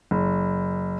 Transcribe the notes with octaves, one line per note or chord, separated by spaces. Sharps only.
F#1